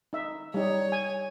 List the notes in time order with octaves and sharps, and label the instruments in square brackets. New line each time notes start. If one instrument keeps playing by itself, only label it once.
[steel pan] D#4 E5
[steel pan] G3 D#4 [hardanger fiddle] C#5
[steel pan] G#5